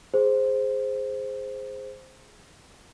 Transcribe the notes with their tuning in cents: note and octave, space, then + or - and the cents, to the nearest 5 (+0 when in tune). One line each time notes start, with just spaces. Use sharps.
G#4 +0 C5 +0